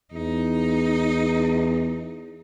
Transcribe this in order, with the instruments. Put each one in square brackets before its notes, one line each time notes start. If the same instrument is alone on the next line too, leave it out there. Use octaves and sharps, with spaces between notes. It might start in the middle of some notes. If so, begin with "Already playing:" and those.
[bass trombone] E2 [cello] D#4